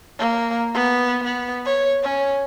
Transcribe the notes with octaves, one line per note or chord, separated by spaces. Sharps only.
A#3
B3
B3
C#5
C#4